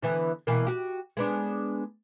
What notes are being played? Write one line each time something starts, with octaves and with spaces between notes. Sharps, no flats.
D3 E3 B3
B2 E3 A#3
F#4 G4
G#3 B3 D4